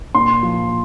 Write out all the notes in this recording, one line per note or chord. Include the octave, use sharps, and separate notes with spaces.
A#2 C6
F3